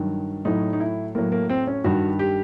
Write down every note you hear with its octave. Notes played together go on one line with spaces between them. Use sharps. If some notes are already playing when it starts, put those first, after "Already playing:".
Already playing: G2 D#3 F#3
A2 F#3 D#4
D#4
E4
A2 F#3 A#3
A#3
C4
C#4
G2 D#3 G3 F#4
G4